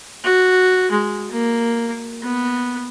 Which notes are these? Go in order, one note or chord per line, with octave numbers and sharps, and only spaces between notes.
F#4
G#3
A#3
B3